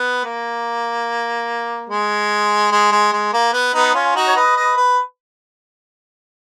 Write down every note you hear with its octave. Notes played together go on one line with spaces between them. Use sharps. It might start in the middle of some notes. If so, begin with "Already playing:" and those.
Already playing: B3
A#3
G#3
G#3
G#3
G#3
A#3
B3
B3 D#4
C#4 F4
D#4 F#4
C#5
B4 D#5
B4 D#5
B4